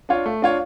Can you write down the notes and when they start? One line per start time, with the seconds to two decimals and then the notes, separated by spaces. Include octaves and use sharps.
0.09 D4 F4 C#5
0.26 A3
0.42 D4 F4 C#5